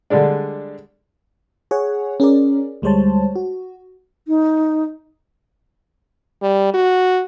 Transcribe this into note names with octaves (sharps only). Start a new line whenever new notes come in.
D3 G3 G#3 D4
G#4 C#5 F#5
C#4 G#4 A#4 D5
D2 G3 G#3 C5 C#5 A5
F#4
D#4
G3
F#4